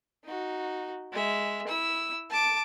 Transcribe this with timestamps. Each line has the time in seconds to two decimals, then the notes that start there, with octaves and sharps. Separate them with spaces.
0.25 D#4 F#4
1.12 G#3 E5
1.67 E4 E6
2.30 A5 D6